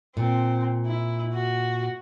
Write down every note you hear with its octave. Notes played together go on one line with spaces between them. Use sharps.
A#2 C4
E4
F#4